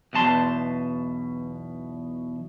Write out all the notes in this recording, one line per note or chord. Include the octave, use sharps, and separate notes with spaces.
B1 E2 B2 A5 C6